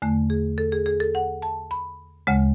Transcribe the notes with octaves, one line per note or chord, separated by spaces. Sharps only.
E2 D3 A3
G#4
A4
G#4
G#4
A4
F#5
A5
B5
D2 C#3 G#3